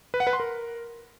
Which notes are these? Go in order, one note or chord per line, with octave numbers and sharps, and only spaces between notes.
B4
F#5
B4
C6
A#4